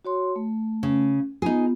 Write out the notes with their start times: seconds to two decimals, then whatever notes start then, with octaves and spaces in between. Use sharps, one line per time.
0.05 F#4 C#5 C6
0.36 A3
0.83 C#3
1.42 B3 D#4 F4 G#4